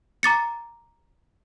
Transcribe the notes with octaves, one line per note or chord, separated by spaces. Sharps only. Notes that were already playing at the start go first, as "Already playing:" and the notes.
A#5 D6 A6 C#7